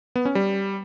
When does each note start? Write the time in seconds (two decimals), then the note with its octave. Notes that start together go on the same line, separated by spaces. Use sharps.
0.16 B3
0.25 C#4
0.35 G3